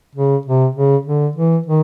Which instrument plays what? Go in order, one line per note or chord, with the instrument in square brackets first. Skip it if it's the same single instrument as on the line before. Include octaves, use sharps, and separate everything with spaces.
[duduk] C#3
C3
C#3
D3
E3
D#3